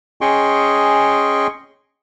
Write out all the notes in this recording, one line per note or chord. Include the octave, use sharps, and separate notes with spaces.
C#4 G#4 D#5 G5 C6 C#6